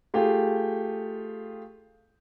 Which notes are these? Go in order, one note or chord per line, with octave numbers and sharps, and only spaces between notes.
A3 F4 G4 G#4